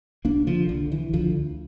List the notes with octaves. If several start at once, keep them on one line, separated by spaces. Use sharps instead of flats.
C2 A#3 D4
D3 F3
C2 D3
E3
D2 D3 F3